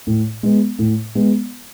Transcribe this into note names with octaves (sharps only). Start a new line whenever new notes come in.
A2
G#3 B3
A2
G#3 B3